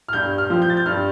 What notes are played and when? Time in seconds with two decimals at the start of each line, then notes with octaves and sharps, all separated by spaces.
0.08 F6
0.13 G2 G6
0.38 F6
0.50 F3 C4
0.62 G6
0.70 A6
0.77 G6
0.86 G2 F6